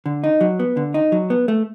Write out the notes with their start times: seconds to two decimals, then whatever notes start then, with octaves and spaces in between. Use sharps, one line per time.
0.06 D3
0.24 D#4
0.41 F#3
0.59 B3
0.77 D3
0.94 D#4
1.12 F#3
1.30 B3
1.48 A3